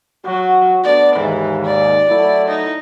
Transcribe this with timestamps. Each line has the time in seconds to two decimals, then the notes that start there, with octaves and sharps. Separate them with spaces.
0.25 F#3 F#4
0.84 A3 B3 D4 D5
1.16 D#2 G#2 E3
1.65 D5
2.08 F#3 A3 E4
2.48 D#4